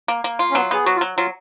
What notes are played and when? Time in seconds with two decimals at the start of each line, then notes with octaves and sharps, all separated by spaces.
0.08 A#3
0.24 A#3
0.39 F4
0.51 C#4
0.55 F#3 B3
0.71 B3 G#4
0.85 F#3 F#4
0.96 F4
1.01 F#3
1.17 F#3 F4